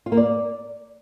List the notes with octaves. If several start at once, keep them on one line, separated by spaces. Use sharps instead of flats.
F4
A#3
D5